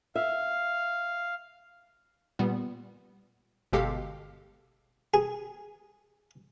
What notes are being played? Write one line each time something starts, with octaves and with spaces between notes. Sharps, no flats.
E5 F5
A#2 G3 B3
G1 B2 G#3 G4 A4 F5
G#4